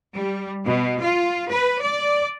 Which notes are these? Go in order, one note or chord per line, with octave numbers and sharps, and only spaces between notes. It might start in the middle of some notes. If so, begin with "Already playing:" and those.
G3
B2
F4
B4
D5